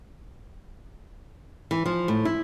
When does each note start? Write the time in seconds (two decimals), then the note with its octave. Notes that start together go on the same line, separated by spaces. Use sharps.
1.71 E3
1.86 F3
2.08 A2
2.25 E4